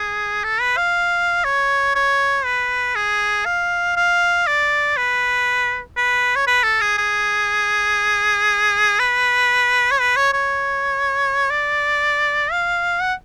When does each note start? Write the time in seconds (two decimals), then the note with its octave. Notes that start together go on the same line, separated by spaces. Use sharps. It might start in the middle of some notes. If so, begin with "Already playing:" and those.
Already playing: G#4
0.44 A4
0.60 B4
0.77 F5
1.44 C#5
1.95 C#5
2.45 B4
2.95 G#4
3.45 F5
3.96 F5
4.47 D5
4.97 B4
5.97 B4
6.36 C#5
6.47 B4
6.64 A4
6.81 G#4
6.98 G#4
8.99 B4
9.91 C#5
10.00 B4
10.16 C#5
10.33 C#5
11.50 D5
12.51 F5
13.01 F#5